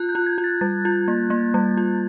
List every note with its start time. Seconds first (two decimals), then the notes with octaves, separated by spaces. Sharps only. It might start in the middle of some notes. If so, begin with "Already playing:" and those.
Already playing: F4 F#6
0.09 G6
0.15 F4
0.27 G#6
0.38 F4
0.44 A6
0.61 G3 A6
0.85 F4
1.08 A#3
1.30 A#3
1.54 G3
1.77 F4